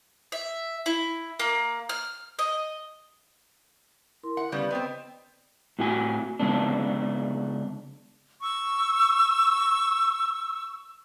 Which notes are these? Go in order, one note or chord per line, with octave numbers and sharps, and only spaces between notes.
E5
E4
A#3
F6
D#5
E4 A#4 C6
F#5
C#3 G3 B3 D5
B3 C4 D#5 G5
A2 F#4 G#5
C#3 G#3 B3 D4
C#6 E6